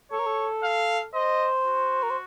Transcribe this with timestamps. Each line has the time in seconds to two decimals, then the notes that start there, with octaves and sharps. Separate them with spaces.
0.12 A4 C#5
0.20 A#4
0.26 A4
0.64 F5
1.14 C5 D#5
1.66 F#4
2.03 A#4
2.10 C5